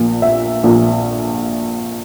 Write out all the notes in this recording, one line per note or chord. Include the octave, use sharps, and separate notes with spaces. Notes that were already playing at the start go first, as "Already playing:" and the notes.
Already playing: A#1 A#2
E5
A#1 A#2